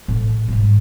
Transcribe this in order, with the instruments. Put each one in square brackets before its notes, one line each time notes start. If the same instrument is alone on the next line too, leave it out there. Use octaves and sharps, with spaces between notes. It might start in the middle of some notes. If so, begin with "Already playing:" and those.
[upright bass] A2
G#2 G3